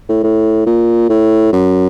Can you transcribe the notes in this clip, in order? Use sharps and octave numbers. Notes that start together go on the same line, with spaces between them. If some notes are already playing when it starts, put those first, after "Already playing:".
A2
A2
A#2
A2
F#2